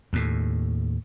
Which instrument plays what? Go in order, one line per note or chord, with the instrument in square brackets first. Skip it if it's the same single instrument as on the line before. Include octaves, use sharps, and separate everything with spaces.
[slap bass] D#2 A2